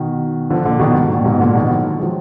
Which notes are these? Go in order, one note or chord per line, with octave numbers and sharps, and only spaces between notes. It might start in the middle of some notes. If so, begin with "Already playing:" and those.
Already playing: B2 D#3
D3 F3
A#2 D3
B2 D#3
G#2
A#2
G#2 B2
A#2 D3
B2 D#3
D#3 F#3
F3 G#3